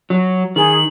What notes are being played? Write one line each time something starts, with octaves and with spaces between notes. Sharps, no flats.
F#3
D#3 G#4 F#7